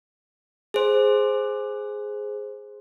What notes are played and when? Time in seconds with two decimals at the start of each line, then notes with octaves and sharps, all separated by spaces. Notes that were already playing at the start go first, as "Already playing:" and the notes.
0.74 G#4 C5